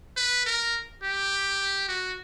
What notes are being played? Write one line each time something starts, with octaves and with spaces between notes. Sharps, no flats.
B4
A#4
G4
F#4